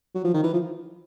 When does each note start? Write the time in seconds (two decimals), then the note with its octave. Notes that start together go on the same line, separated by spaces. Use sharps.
0.15 F#3
0.24 F3
0.34 D#3
0.43 E3
0.53 F3